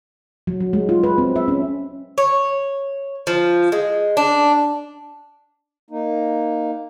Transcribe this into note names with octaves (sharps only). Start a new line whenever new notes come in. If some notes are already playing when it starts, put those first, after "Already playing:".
F#3
F#3
G#3
F4
B4
C4
E5
C#4
C#5
F3
G#3
D4
A#3 D#4